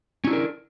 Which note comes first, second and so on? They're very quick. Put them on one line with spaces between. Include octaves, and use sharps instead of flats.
C#4 E4 D4 A#4